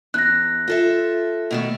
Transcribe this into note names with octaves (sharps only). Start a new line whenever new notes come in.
E2 F#6 A#6
F4 A4 E5
B2 D#3 A3